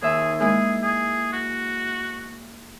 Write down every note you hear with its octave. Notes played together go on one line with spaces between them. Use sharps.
D#2 G#4 E5
G#3 A#3 E4 G#4
G#4
F#4